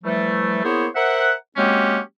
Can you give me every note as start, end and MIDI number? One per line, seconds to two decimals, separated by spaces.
0.04 0.63 52
0.04 0.63 53
0.04 0.63 55
0.04 0.63 57
0.64 0.87 58
0.64 0.87 59
0.64 0.87 64
0.64 0.87 68
0.64 0.87 72
0.64 0.87 73
0.95 1.32 70
0.95 1.32 72
0.95 1.32 76
0.95 1.32 78
1.57 2.00 54
1.57 2.00 56
1.57 2.00 58
1.57 2.00 60
1.57 2.00 61
1.57 2.00 67